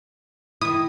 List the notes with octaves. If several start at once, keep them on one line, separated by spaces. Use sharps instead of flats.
D#3 E4 D#6